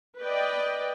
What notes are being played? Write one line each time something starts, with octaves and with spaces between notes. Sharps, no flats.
B4 D5 D#5 G5